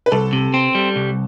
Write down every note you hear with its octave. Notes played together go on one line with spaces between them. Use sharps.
B4
C2 A4
C3
C4
G3
C2